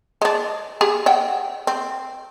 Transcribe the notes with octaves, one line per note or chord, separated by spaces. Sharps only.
G#3 D4
G4 G#4
E5 F#5 G5
C4